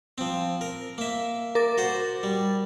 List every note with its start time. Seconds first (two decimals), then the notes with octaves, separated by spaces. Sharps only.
0.18 F3 C4
0.61 A#4
0.98 A#3 E5
1.55 A#4 D6 A6
1.78 F#4 C5
2.23 G3